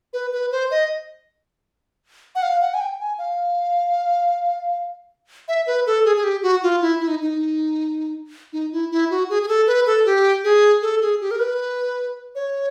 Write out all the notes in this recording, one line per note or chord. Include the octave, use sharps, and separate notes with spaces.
B4
B4
C5
D#5
F#5
F5
F#5
G#5
G5
G#5
F5
E5
B4
A4
G#4
G#4
G4
F#4
F4
E4
E4
D#4
D#4
D#4
E4
E4
F#4
G#4
G#4
A4
B4
A4
G4
G#4
A4
G#4
G4
A#4
B4
C#5